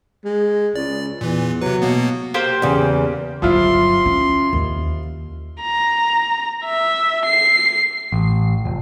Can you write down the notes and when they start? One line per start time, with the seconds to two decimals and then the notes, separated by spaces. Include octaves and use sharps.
0.25 G#3
0.76 C#2 D5
1.21 E2 A#2 E3
1.61 C3 F#3 B4
1.82 B2 A#3 B3
2.34 A#3 G4 C5
2.62 E2 C#3
3.42 G1 F3 F#3 E4 F4 C6
4.06 C#4
4.53 D#2
5.61 A#5
6.65 E5
7.26 C7
8.12 A1
8.65 F1